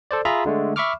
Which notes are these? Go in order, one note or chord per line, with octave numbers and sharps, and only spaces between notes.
A4 C5 D5
F4 G#4 E5 A#5 B5
D3 G#3 A3
E5 B5 C#6 D6 F6